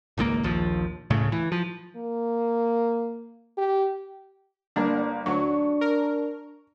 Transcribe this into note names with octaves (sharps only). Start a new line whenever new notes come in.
G#1 C#2 C#3 A#3
A#1 D#2 F3
D1 A2 C#3 A3
E3
F3
A#3
G4
G1 A#3 D4
D2 F#3 D4 C#6
A#4